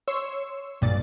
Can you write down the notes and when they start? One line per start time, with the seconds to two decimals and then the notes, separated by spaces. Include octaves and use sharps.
0.08 C#5 C6 C#6 E6
0.81 B1 G2 A#2 D5 A6